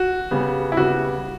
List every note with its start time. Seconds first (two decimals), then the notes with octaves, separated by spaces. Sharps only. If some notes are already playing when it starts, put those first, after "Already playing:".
Already playing: F#4
0.31 C#3 G3 B3
0.72 E4
0.77 C#3 G3 B3 F#4